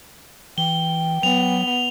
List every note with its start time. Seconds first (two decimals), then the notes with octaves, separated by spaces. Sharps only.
0.58 E3 G5 G7
1.23 F#3 B3 F7